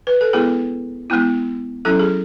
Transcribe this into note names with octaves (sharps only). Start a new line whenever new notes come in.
B4
A4
G#3 B3 E4 G#4
G#3 B3 E4
F#3 C#4 E4 A4
G#4